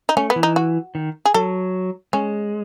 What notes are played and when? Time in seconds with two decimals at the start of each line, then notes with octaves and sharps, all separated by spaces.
0.09 D#4
0.17 A3 C#4
0.30 B3
0.36 E3
0.43 D#4
0.56 F#4
0.95 D#3
1.25 G#4
1.34 F#3 A4
2.13 G#3 C#4